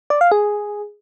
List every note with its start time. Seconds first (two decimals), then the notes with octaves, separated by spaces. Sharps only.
0.10 D5
0.21 F5
0.32 G#4